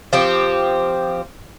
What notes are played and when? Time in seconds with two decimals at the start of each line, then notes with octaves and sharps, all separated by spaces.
0.13 F3 C4 G4